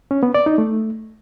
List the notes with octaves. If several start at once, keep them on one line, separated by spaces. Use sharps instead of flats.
C#4
B3
D5
D#4
A3